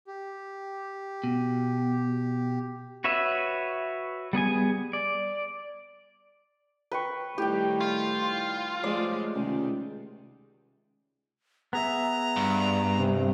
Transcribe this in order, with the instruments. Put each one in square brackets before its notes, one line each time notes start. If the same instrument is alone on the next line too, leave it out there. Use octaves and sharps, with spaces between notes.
[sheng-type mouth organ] G4
[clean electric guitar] B2
[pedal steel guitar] F#4 B4 C#5 E5
G3 B3 G#4 G#5
D5
[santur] B4 G5 C#6
[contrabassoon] A2 [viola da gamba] D#3 G3 [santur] G4 G5
[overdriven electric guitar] F4
[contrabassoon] F3 [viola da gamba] G#3 A3 [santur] D5
[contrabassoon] C#2 [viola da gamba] C3 D#3 G#3
[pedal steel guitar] B3 G#4 E5 [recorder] A#5
[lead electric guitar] G2
[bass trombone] C3